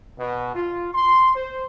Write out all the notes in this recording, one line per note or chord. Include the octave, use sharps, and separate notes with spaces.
B2
F4
C6
C5